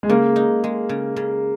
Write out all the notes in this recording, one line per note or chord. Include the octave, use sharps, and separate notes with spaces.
G#3
C#3 A#3
D#4
G#3
C#3
C#3